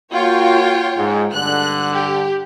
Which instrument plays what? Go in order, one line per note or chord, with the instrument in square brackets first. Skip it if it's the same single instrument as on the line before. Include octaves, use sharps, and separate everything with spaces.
[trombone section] A#3 F#4 [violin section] F4 C#5 G5
[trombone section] G#2
[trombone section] G2 D3 [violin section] F#6
[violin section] G4